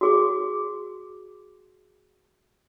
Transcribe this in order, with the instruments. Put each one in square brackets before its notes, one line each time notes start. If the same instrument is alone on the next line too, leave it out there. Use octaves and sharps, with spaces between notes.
[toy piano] F#4 G#4 D6